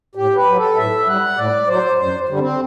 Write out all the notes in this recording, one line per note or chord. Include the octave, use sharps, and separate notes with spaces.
A2 G4
B4
F#3
A4
A2 E5
G3 F#5
A2 D5
F#3 C5
F#2 C5
D3 G3
C4